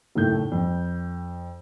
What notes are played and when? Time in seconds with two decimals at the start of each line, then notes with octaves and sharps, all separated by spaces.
0.15 F#1 D#2 A2 A3 G6
0.52 F2